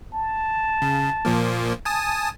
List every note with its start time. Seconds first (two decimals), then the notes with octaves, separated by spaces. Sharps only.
0.14 A5
0.82 C#3
1.25 A#2 F3 A#3
1.85 G#5 A5 D#6